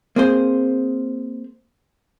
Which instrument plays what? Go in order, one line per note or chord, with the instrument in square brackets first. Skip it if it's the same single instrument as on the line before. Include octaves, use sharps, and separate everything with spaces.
[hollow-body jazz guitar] A#3 C4 G#4 C5